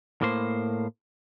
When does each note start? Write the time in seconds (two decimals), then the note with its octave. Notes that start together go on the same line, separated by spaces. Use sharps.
0.22 A2 A#3 C5